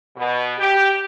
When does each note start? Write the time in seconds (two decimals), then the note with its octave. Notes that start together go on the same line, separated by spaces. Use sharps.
0.17 B2
0.58 G4